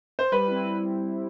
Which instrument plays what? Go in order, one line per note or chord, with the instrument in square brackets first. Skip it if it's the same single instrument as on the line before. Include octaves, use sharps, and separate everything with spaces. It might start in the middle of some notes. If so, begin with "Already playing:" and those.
[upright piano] C5
[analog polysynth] G3 [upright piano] B4
[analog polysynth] C4 E4